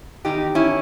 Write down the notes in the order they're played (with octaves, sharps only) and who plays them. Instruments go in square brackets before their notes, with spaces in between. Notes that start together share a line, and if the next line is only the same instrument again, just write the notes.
[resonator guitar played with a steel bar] E2 D#3 D#4 G4
C#4 E4